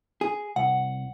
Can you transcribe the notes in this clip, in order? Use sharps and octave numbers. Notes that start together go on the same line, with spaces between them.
G#4
C2 F#5